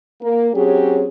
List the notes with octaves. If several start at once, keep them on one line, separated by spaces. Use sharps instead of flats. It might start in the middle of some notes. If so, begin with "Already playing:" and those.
A#3
F#3 C4 C#4 G4 G#4